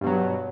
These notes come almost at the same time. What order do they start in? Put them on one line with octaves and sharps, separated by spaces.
G2 B2 F#3